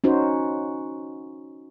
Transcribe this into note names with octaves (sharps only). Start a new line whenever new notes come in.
C#4 D#4 F#4 C5